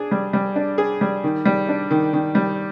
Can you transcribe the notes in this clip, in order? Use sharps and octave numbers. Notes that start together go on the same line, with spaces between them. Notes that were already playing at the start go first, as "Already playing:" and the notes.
Already playing: D4 G#4
G3
G3
D4
G#4
G3
D#3
G3
D4
D#3
D#3
G3